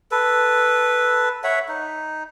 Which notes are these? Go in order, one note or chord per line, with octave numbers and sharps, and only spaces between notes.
A4 B4
C#5 E5 F#5
D#4